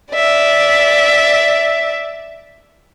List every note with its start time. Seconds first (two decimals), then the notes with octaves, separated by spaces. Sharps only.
0.13 D5 E5